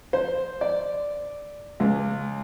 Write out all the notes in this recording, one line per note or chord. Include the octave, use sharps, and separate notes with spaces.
C5
D5
C#2